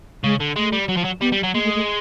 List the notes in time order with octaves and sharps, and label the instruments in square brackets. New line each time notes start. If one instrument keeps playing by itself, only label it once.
[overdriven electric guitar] C#3 [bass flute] G#3
[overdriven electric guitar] D3
[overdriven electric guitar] G#3 [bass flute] A3
[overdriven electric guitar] G3
F#3
F3
F#3
[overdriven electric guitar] G3 [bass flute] B3
[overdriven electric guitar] G3
F#3
[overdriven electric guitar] G#3 [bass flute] A#3
[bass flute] A3
A3